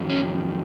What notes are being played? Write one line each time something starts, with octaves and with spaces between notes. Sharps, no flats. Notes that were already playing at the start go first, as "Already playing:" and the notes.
Already playing: F2 D#3 F#3
C#4